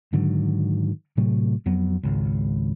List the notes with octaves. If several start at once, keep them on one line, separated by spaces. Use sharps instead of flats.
G#2 D3 D#3 F#3
A2 C3 F#3 A3
F2 F#3 B3
G#1 C#2